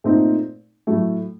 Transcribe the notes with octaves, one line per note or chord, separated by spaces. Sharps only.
A#2 A3 C4 D#4
A2 F#3 A3